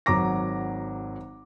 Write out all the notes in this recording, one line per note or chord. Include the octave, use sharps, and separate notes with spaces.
G#1 F#3 A#5 D6 A#6